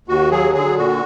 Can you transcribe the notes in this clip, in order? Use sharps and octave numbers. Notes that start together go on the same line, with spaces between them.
D#2 F#4
F#3 G#4
D3 G#4
A#2 F#4